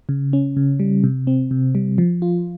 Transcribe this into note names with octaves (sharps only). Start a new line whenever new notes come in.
C#3
C#4
C#3
G3
C3
C4
C3
G3
F3
F4